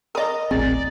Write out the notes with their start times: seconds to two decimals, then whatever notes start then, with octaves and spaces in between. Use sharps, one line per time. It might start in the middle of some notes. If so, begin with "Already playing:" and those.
0.15 A#4 D5 D#5 A#5 D#6
0.51 D#1 A1 C4 G#4 D5